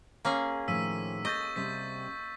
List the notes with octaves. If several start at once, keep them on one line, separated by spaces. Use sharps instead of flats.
A#3 C#4 G#4
A2 D#3 F3 E6 B6 D#7
G#3 A4 D#5 C#6 G6 A6
C3 G3 C5 B6